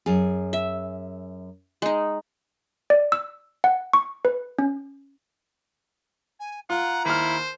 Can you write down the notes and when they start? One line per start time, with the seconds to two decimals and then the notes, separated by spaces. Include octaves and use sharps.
0.06 F#2 G#4
0.53 E5
1.82 G#3 D#4
2.90 D5
3.12 E6
3.64 F#5
3.93 C#6
4.25 B4
4.59 C#4
6.40 G#5
6.70 F4 F#5 A#5
7.05 D#2 E4 C5 F6